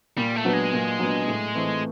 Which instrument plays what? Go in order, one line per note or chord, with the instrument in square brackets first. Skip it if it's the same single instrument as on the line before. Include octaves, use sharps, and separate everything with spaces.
[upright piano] A#2 [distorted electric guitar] G3
[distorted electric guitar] A3
[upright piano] F#3 B3 D4
[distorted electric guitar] G#3
[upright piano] A#2
F#3 B3 D4
A2
E3 A3 C4